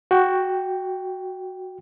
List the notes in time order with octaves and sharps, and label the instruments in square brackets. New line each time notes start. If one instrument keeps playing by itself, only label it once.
[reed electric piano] F#4 G5